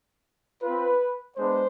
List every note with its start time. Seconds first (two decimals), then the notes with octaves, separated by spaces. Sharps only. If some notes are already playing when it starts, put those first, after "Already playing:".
0.63 C4 F4 B4
1.37 G#3 B3 D4 C5